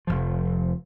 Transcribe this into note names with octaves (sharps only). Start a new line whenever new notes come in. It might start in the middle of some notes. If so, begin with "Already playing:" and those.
F1 C#2 F3